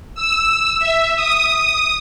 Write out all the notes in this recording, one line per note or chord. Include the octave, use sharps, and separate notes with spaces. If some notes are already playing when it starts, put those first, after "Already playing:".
E6
E5
D#6